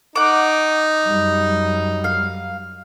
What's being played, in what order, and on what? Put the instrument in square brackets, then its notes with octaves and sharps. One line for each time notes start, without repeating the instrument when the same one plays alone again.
[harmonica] D#4 [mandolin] F#5 D6
[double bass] F#2 G3
[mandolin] F5